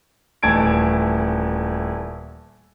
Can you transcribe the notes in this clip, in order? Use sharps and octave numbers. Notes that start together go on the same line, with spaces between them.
D#1 E3 A3 A5 G#6 D7